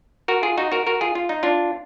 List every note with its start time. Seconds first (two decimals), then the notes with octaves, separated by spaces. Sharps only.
0.28 F#4 A#4
0.43 F4 G#4
0.57 D#4 F#4
0.72 F#4 A#4
0.87 F#4 A#4
1.01 F4 G#4
1.15 F4
1.29 D#4
1.43 D4 F4